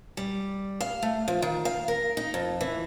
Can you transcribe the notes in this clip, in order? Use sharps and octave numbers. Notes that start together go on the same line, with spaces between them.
G3
F5
A3
F3
D#3
F5
A#4
D#4
F2
E3